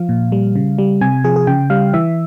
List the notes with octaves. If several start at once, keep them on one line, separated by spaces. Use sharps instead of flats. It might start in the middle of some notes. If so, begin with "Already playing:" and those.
Already playing: F3 F5
A#2
G3
C#3
G3
C3 G#5
F3 G#4
G#4
C#3 G5
G3 F5
E3 E5